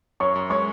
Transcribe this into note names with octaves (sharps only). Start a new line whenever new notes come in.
F#2 C#5 C#6
F#2
G#3 C#5 C#6